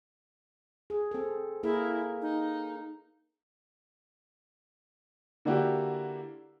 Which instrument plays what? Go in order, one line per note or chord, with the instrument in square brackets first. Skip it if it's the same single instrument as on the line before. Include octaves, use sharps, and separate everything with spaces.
[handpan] G#4
C4 A4
[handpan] A#3 G#4 A#4 [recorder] E4
[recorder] D#4
[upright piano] D3 A#3 D4 E4 F#4 G4